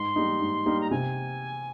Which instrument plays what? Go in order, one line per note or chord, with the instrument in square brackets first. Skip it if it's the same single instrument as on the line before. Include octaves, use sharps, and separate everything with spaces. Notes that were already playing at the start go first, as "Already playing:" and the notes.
Already playing: [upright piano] G#2 [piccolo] C6
[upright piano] G3 A#3 D#4
G#2
G3 A#3 D#4
[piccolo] A#5
[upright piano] C3 [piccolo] G#5